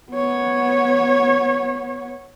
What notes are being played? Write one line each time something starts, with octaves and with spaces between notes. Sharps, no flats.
B3 C#5